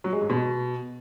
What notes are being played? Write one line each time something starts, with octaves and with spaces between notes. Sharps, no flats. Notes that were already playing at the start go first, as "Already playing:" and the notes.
F#3
G#3
G#2
B2